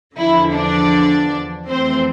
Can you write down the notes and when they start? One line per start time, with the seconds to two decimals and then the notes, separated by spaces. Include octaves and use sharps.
0.15 E2 D3 F3 E4
0.53 D4 D5
1.67 F2 E3 A3 C4 C5